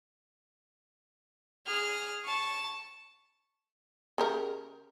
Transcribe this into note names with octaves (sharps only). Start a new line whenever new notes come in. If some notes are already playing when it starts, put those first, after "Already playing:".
G#4 F6
A5 C#6
C#3 G4 A#4